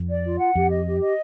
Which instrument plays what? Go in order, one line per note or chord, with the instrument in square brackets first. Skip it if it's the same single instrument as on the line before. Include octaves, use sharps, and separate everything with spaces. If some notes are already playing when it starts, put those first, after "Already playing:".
Already playing: [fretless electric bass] F2
[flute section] D5
F4
F#5
[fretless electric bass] F2 [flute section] G4
[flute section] D#5
G4
D#5